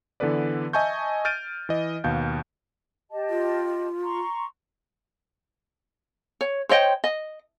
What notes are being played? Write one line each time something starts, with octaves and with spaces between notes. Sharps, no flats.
D3 E3 B3 A4 B4 D5
D#5 E5 G#5 A5 C#6 G6
F6 G6 A6 D7 D#7
E3 D#5
D#2 B2 F5 G6
G4 D#5 A5
F4
A#5 C6 C#6
C#5
C5 C#5 D#5 G5
D#5